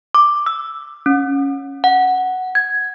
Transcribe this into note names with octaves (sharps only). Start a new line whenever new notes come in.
D6
E6
C#4
F#5
G#6